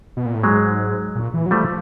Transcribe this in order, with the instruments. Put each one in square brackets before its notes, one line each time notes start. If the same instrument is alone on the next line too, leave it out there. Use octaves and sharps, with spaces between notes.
[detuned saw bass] B2
A#2
A2
[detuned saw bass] G#2 [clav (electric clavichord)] F#3 G#3
[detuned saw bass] A#2
E3
F#3
[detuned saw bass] F3 [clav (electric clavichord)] G3 A3